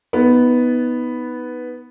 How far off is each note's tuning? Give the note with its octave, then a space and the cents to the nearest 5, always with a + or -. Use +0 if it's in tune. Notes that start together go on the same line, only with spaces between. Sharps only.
B3 +0 D#4 +20